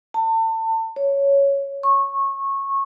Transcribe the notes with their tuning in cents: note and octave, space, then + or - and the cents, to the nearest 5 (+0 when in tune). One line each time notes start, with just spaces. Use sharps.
A5 +35
C#5 +5
C#6 -20